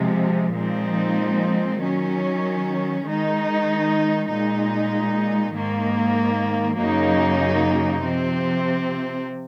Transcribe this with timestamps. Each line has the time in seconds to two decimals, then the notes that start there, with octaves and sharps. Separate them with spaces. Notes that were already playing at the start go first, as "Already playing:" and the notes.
Already playing: C3 F3 G#3
0.56 A#2 F3 G#3 C4 D#4
1.80 D#3 F#3 C#4
3.05 D#3 G#3 D#4
4.29 A#2 G#3 D#4
5.53 G#2 D#3 A#3
6.77 F#2 C#3 F#3 A#3 D#4
8.02 C3 F3 C4